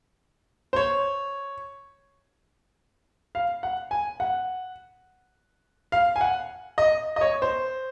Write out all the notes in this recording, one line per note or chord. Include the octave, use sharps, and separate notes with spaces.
C5
C#5
F5
F#5
G#5
F#5
F5
G#5
F#5
D#5
D#5
C#5
C5